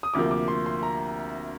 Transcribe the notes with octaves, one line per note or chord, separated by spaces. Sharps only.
D#6
D2 C3 F3 A#3 D6
D6
C6
C6
A#5